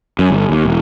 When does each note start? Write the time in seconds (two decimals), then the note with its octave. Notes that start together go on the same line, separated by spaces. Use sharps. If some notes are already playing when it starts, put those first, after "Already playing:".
0.19 F#2
0.30 G1
0.50 D#2
0.65 E1